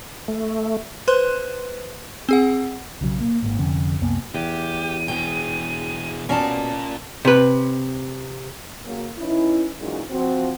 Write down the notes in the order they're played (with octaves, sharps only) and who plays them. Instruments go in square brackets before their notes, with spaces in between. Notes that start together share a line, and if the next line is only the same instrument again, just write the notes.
[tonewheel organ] A3
[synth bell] B4 C5 C6 F#6
C4 G#4 F#5
[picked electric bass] B1 C#3 F#3
A#3
G#1 G#2 A#3
F1 F2 D3 C#4
C2 F#2 A#3 B3
[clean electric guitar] E2 [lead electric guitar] G4 [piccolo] D#7
[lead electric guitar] B2 G#4 [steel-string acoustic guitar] G5
[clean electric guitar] B2 [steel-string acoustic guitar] C#4 D5 A5 [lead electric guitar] F4 A#4
[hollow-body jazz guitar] C3 B4
[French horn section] C#3 F#3 A#3
E3 C#4 D#4 E4
A#2 E3 F#3 G#3 C#4 D#4
F3 C4 F#4